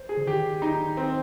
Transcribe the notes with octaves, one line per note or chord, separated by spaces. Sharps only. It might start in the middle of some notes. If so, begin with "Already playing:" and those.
Already playing: C5
G#4
D3
D#3 G4
D#4
C4